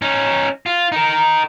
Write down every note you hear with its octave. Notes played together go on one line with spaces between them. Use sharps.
C#4 D#4
F4
D#4 A#4